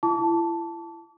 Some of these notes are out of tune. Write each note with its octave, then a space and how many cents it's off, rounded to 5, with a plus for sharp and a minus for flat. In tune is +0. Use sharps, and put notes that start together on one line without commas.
E4 +35 A5 +0 D6 -40